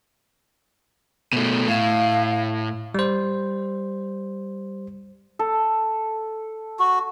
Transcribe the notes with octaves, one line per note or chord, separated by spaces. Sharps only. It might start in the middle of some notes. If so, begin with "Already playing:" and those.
B2 A3
A2 F5
G3 C5
A4
F#4